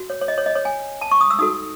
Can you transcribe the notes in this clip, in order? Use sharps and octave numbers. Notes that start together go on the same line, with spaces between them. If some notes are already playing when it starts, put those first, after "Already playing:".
Already playing: F#4
C#5
C#5
D#5
C#5
D#5
C#5
G#5
A5
C#6
D#6
E6
D#4 F#4 A4 D#6